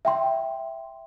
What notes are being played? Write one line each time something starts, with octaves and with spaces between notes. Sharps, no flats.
E5 G5 C6